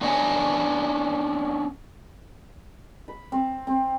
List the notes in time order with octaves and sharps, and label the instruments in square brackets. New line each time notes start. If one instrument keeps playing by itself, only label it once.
[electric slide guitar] B3 C#4 D4 D#5 F#5 G#5
[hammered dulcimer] B5
C4
C4